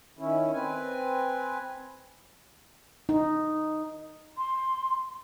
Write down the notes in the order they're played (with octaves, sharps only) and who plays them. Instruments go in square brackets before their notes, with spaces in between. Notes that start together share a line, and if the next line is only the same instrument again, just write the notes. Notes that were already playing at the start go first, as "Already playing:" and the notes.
[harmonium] D#3 C#4 E4
C4 B4 G#5
[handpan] D#4
[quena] C6